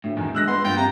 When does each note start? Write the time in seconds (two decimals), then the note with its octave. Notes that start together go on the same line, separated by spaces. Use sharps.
0.04 D2 A2
0.17 E2 A2 D#3
0.35 D2 G#3 E6 F#6 A#6
0.47 G1 B4 F#5 C6
0.64 A#1 G2 F4 G5
0.77 C3 A#5